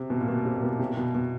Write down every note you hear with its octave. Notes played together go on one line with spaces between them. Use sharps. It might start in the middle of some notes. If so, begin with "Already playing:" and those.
Already playing: C3
B2
A#2
B2
C3
A#2
B2
C3
B2
B2